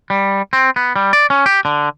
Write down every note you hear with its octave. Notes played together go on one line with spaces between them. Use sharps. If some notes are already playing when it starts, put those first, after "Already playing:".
G3
C4
B3
G3
D5
C#4
G4
D3